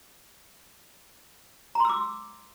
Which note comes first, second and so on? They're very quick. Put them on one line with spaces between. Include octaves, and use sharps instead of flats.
A#5 C6 E6 D6